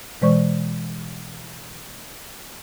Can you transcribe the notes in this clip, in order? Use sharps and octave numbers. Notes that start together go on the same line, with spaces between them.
B2 E3 G#3 C5 D5 C#6